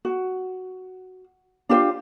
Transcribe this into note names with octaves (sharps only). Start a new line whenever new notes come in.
F#4
D4 F4 G4 C5